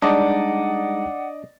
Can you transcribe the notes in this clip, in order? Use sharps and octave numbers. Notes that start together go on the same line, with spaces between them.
G3 G#3 D4 D#4 D5 D#5 F#5